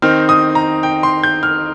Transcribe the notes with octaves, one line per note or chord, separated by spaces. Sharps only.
D#3 C4 D#4 F6
D#6
A#5
G5
C6
G6
F6